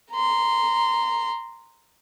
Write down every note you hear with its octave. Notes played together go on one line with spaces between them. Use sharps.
A#5 C6